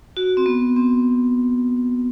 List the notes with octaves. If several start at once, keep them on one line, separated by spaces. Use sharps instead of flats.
F#4
C4
B3
C4